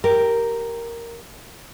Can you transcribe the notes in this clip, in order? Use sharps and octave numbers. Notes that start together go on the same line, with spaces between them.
G4 A#4